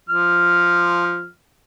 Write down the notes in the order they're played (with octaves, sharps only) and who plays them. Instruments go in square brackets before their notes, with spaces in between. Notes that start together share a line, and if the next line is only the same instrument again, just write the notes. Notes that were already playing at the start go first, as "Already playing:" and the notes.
[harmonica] F3 F6